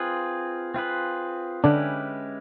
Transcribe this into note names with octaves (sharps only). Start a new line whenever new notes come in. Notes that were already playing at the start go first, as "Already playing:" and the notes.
Already playing: C4 F4 G#4 B4
C4 F4 G#4 B4
D3 G#3 C#4 D4 E4 G4 B4